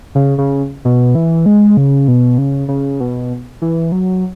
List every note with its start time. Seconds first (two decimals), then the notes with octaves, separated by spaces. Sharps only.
0.15 C#3
0.38 C#3
0.85 B2
1.15 E3
1.46 G#3
1.77 C#3
2.08 B2
2.38 C#3
2.68 C#3
3.00 B2
3.62 E3
3.92 F#3